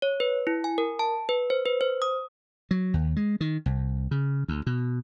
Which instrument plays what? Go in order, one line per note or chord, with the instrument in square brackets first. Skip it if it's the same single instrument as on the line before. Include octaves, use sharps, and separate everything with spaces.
[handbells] C#5
B4
E4
G#5
A#4
A5
B4
C5
B4
C5
D#6
[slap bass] F#3
D#2
G#3
D#3
C2
C#3
D2
B2